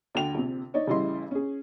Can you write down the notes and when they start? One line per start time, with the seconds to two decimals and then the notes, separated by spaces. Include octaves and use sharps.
0.15 D2 D3 G5 F7
0.35 A#1 C3
0.74 D#4 C#5 D5
0.87 A1 C#3 G3 E4 D#5 C6
1.31 C#4 G#4